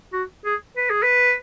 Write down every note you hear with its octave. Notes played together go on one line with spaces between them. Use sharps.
F#4
G#4
B4
G#4
B4